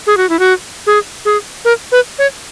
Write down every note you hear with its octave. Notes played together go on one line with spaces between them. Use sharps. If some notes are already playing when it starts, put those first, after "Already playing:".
G#4
F#4
E4
F#4
G#4
G#4
A#4
B4
C#5